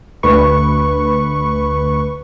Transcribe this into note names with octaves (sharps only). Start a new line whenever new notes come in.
D2 B4 C#6